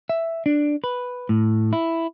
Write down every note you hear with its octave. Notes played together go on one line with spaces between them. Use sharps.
E5
D4
B4
A2
E4